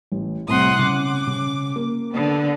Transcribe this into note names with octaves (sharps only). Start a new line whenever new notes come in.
A1
C2 A2 C3 F#5 C6 D#6
C#3 D6
C#3
A#3
D3 B3